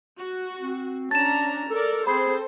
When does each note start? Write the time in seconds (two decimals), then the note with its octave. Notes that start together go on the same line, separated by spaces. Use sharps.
0.18 F#4
0.60 C4
1.11 C#4 D4 A5 A#5 A6 E7
1.70 A4 A#4 D5
2.07 C4 G#4 A4 C5 B5